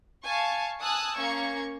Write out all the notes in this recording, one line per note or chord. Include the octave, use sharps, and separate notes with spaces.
F5 G#5 A5 C#6
G#5 A5 D#6 E6 F#6
A#3 C#4 C#6 G#6